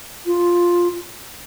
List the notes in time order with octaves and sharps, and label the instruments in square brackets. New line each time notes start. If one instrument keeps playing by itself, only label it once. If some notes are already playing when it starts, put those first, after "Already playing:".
[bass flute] F4